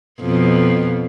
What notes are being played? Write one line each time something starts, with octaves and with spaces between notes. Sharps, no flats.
F2 B2